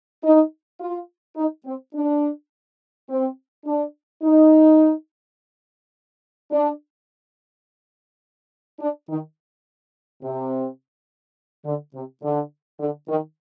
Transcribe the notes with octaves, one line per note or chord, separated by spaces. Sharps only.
D#4
F4
D#4
C4
D4
C4
D4
D#4
D4
D4
D#3
C3
D3
C3
D3
D3
D#3